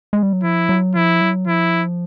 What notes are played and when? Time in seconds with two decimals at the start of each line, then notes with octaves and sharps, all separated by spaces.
0.13 G#3
0.23 G3
0.33 F#3
0.43 F3 E4
0.69 F#3
0.95 F3 E4
1.21 F#3
1.47 F3 E4